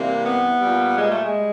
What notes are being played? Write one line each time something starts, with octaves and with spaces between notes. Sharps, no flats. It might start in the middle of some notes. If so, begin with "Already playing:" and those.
Already playing: C3 E3 G3 A#3
B3
A#2 G3
G#3
A3
G#3
G3